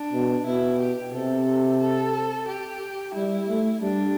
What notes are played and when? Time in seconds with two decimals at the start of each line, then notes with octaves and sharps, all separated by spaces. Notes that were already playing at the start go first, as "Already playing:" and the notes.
Already playing: D4
0.13 B2
0.46 B2 E4
0.79 G4
1.13 C3 A4
1.80 A4
2.48 G4
3.15 G3 E4
3.49 A3
3.82 G3 D4